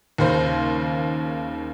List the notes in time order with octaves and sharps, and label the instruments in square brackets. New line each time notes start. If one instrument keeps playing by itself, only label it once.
[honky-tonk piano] D#2 C#3 C5